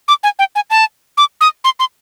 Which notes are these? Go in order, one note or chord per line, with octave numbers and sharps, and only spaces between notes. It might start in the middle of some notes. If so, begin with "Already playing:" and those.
D6
G#5
G5
G#5
A5
D6
D#6
C6
C6